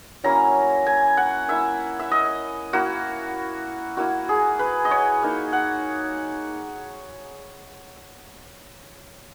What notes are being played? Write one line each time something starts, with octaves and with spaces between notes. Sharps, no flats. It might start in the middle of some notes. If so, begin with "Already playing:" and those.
F#3 A#3 C#4 E4 A#5
G#5
F#5
A#3 E4 E5
E5
D#5
A#3 E4 F#4
A#3 E4 F#4
G#4
B4
D#5
C#5
A#3 D#4
F#5